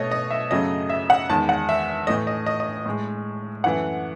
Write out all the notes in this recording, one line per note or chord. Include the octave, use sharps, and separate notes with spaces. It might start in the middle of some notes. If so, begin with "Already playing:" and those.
Already playing: B2 A3 C#5 D#5
D#5
E5
F#2 C#3 F#3 A3 D#5
E5
F#5
E2 D#3 G#3 A5
F#5
E5
A2 E3 A3 D#5
D#5
D#5
D#5
A2 G#3
F#2 E3 A3 F#5